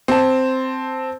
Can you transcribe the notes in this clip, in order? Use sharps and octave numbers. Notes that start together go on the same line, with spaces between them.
C4 A5